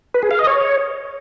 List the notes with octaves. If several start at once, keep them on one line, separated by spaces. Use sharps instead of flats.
B4
G#4
F5
D#5
C#5